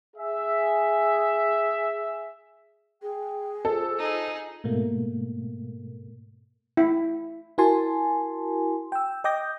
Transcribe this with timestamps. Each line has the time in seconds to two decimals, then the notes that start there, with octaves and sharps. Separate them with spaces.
0.16 G#4 E5
3.02 G#4 G5
3.65 F4 A4 C5 E6
3.98 D#4 G#4
4.64 G#2 B2 A3 A#3
6.77 E4
7.58 E4 F#4 A#4 G#5 A5 C6
8.92 G5 E6
9.24 D#5 G5 D6 D#6 G6 A#6